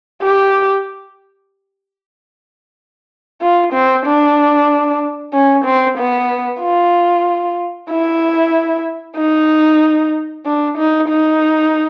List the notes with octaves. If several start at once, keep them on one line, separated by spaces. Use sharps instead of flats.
G4
F4
C4
D4
C#4
C4
B3
F4
E4
D#4
D4
D#4
D#4